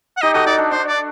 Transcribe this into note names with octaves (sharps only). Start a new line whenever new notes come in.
F#5
D#4 G4 D#5
F#4 A4 D#5
D#4 D5
D4
D4 C5
D5